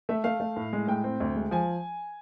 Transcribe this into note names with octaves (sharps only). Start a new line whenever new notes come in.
A3 E5
A3 F5
A3
A2
G#3
A2 G5
C4
D2
G#3
F3 G#5